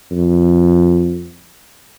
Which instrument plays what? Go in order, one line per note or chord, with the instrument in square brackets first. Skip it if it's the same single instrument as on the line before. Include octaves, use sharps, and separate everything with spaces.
[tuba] F2